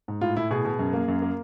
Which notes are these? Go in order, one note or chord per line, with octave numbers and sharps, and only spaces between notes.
G#2
A2 F4
A2 E4
B2 G#4
B2
F#2
A#3
F#2
A#3